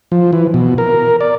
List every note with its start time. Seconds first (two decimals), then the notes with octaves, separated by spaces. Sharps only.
0.12 F3
0.33 E3
0.54 B2
0.78 A#4
1.21 D5